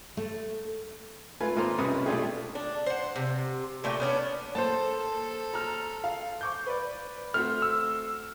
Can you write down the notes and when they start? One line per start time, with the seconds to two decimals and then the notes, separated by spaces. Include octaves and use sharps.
0.17 A3
1.40 A3 F4 B4 G#5
1.56 G#1 A#3 F4 C5 A#5 C6
1.78 B1 F#2 C3 G3 B4 D#6
2.06 B2 A3 D4 F4 G4 G#4
2.55 D4
2.86 C5 F#5
3.16 C3
3.84 A#2 A3 E5 G5
4.00 B3 C#4 D4
4.55 A#3 A4 C5 A5
5.53 A#5 F6
6.04 F5
6.41 C#6 D6 G6
6.66 B4 D5
7.34 A3 C4 F#4 F6
7.62 E6